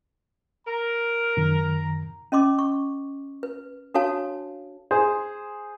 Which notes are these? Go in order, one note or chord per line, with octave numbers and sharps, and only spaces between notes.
A#4 A#5
F#2 D#3
C#4 D#5 C6 D6
C#6
B4
D4 F#4 A4 C#5 F5 A5
G#4 C5